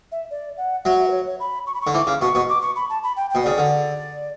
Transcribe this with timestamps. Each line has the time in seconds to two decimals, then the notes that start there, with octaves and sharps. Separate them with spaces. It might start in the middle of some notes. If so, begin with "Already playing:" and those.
0.12 E5
0.31 D5
0.57 F#5
0.85 F#3 E5
0.99 E5
1.08 B4
1.12 C#5
1.26 C#5
1.40 B5
1.67 C#6
1.74 B5
1.81 C#6
1.87 D3
1.94 E3 D6
2.07 C#3
2.21 B2 C#6
2.35 B2
2.49 D6
2.62 C#6
2.76 B5
2.90 A5
3.03 B5
3.17 G5
3.31 B2 G5
3.43 C#3 D5
3.58 D3